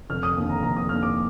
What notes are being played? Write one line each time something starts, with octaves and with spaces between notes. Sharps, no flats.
F1 F6
D#6
D#2 D3
A#5
F1 A#5
D#6
D#2 D3 F6
D6